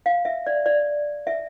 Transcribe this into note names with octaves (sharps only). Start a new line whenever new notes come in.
F5
E5
D5
D5
E5